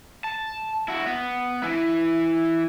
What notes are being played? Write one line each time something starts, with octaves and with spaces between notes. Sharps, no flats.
A5
E4 F#4
B3
E3 E4